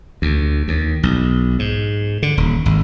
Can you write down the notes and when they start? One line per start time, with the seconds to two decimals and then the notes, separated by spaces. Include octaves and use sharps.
0.22 D2
0.68 D#2
1.03 B1
1.59 G#2
2.23 D3
2.37 D#1
2.65 G#1